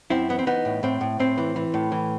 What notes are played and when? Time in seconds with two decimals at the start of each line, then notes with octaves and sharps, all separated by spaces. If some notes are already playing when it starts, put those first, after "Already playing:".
0.10 F#2 C4 E4
0.29 E3 B3
0.39 C4
0.46 E3 B3 D#4
0.65 A2
0.83 A2 C4
1.01 A2
1.20 A2 C4
1.38 E3
1.56 E3
1.74 A2
1.92 E3